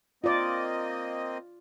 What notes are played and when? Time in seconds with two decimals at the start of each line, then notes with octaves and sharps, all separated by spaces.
0.24 A#3 C4 F4 D5 D#5